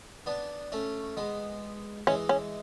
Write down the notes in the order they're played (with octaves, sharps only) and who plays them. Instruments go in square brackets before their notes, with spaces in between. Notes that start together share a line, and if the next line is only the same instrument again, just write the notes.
[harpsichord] B3 D4
A3 C#4
G#3 B3
[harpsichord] E3 G#3 [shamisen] C#4
[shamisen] C#4